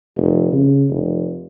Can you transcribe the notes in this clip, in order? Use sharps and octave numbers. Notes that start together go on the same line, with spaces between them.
F1
C#3
F1